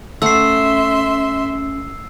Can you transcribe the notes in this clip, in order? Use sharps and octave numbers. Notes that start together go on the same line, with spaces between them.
A3 C#4 E5 F#5 C6 E6 C7